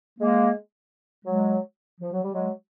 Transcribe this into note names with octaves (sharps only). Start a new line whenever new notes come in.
G#3 A#3
F#3 G#3
F3
F#3
G3
F#3 G#3